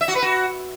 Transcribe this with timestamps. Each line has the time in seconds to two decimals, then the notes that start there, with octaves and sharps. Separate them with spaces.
0.01 E5
0.08 F#4
0.15 B4
0.22 F#4